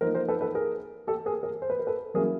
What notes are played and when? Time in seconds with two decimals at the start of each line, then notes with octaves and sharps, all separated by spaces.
0.01 F3 A#3 D#4 A#4 C5
0.15 A#4 C5
0.29 A4 B4
0.41 A4 B4
0.55 G#4 A#4
1.07 G4 A4
1.26 G#4 A#4
1.43 G#4 A#4
1.62 C5
1.70 B4
1.79 A#4
1.87 A4 B4
2.14 F#3 A#3 C#4 E4 G#4 A#4